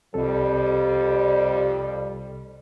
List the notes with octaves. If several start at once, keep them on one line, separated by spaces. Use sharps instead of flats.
C2 F2 C3 G3 A4